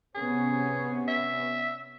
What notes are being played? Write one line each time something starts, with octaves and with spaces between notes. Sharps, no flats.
C3 B3 C#4 G#4
E5